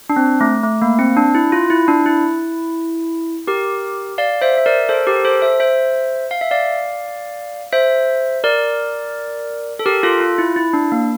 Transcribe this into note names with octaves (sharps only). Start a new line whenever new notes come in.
D4
C4
A3
A3
A#3
C4
D4
E4
F4
E4
D4
E4
G4 A#4
D5 F5
C5 E5
E5
A#4 D5
A4 C5
G4 A#4
A4 C5
C5 E5
C5 E5
F5
E5
D5 F5
C5 E5
A#4 D5
A4
G4 A#4
F4 A4
F4
E4
E4
D4
A#3